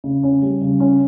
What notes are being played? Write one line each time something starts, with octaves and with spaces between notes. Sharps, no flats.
C#3
C#4
G3
C#3
C#4